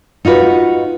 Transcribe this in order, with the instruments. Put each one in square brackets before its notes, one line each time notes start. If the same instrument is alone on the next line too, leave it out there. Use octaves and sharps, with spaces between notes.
[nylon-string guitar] D#4 F4 F#4 B4